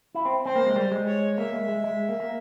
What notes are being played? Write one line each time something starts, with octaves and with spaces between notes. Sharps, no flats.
E4
C4
C4 C5
A#3
G#3
G3
G#3
C#5
A#3 E5
G#3
G#3
G#3
A#3
A#3